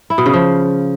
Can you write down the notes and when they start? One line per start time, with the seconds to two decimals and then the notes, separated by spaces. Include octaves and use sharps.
0.10 E4
0.18 B2
0.26 C#3
0.33 F3